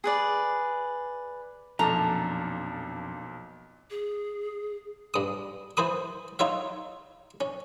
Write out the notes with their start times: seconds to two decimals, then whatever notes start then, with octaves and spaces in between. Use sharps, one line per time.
0.04 G#4 B4 D5
1.79 B1 F2 A#2 F3 D4 A4 A#5
3.90 G#4
5.14 G2 D#6
5.77 E3 C5 B5 D#6
6.39 D#4 F4 C#5 E5
7.41 C#4